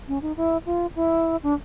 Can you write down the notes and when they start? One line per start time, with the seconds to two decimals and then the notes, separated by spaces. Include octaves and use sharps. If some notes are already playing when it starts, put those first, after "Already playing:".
0.08 C#4
0.22 D#4
0.37 E4
0.66 F4
0.95 E4
1.43 D4